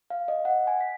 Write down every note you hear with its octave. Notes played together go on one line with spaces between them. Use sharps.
F5
D#5
F#5
G#5
B6